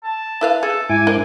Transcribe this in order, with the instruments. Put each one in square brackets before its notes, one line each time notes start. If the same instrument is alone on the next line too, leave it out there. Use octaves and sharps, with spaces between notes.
[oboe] A5
[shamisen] E4 B4 F5
[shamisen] G#4 [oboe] A4
[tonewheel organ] G#2 E4 D6 [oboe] G#5
[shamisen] C4 D4 A#4